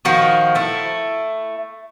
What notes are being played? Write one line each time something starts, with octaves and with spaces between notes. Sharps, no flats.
D#3 F3 F#4
A3 E4